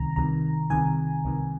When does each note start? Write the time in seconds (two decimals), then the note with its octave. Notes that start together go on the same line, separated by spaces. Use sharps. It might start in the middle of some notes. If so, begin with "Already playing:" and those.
Already playing: C2 C3 D#3 A#5
0.16 C2 C3 D#3 A#5
0.70 C2 C3 D#3 G#5
1.24 C2 C3 D#3